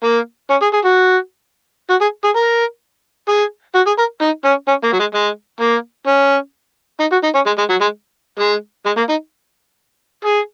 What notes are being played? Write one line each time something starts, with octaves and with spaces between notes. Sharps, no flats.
A#3
C#4
G#4
G#4
F#4
F#4
G#4
G#4
A#4
G#4
F#4
G#4
A#4
D#4
C#4
C#4
A#3
F#3
G#3
G#3
A#3
C#4
D#4
F#4
D#4
C#4
G#3
G#3
F#3
G#3
G#3
G#3
A#3
D#4
G#4